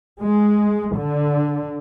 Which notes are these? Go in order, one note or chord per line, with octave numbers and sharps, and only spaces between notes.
G#3
D3